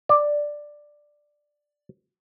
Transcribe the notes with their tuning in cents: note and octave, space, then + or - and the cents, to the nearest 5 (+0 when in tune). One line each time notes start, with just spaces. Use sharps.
D5 +5